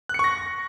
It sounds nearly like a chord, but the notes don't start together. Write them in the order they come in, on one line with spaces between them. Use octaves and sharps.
F#6 C#7 C#6 A#6